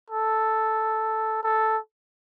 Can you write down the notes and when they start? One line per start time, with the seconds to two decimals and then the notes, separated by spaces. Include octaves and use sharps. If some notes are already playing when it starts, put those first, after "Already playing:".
0.10 A4
1.43 A4